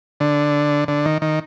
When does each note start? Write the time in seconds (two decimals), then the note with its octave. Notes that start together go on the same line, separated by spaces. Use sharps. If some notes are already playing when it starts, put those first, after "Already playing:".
0.20 D3
0.88 D3
1.06 D#3
1.22 D#3